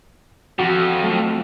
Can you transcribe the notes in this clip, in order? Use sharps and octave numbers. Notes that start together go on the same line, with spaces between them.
F2 E3 F3 F#4
F#3 A3